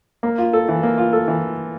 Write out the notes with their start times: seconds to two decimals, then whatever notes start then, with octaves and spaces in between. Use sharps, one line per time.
0.23 A#3
0.38 F4
0.53 A4
0.69 E3
0.83 A#3
0.98 F4
1.13 A4
1.28 E3